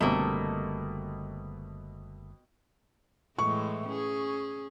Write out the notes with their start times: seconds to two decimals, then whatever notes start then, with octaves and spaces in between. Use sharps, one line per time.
0.01 F#1 B2 D3 G3 A3 A#3 C4
3.39 A2 E3 G#3 C#6
3.89 C#4 G#4